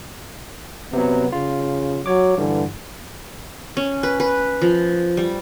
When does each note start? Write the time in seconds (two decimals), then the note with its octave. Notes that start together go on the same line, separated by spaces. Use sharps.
0.93 C3 F#3 B3
1.32 C#3 F4
2.06 F#3 C#5 D6
2.38 G2 D3 E3
3.77 C#4
4.03 B4
4.20 B4
4.62 F3
5.17 G3